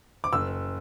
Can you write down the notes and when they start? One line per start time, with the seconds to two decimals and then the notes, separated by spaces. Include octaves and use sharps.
0.24 D6
0.32 F#1 E6